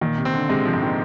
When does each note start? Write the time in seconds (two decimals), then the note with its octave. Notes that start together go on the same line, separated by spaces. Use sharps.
0.01 A#2 D#3
0.18 C3
0.25 C4
0.34 D3
0.49 C3 G#3
0.65 F3
0.74 G#2
0.82 D#3